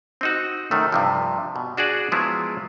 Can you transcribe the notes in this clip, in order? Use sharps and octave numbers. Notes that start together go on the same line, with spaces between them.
C4 D#4 F#4
F#2 D#3 A3
G2 C3 F3
B2
D4 F#4 G#4 D5
F3 F#3 G#3 B3 E4 F4